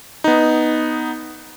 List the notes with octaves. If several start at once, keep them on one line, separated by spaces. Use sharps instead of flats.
B3 D#4